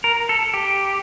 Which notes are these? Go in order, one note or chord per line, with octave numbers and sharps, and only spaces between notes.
A#4
A4
G4